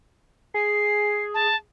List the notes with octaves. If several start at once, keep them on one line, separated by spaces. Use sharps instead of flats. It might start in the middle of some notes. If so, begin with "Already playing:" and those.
G#4 C7
A5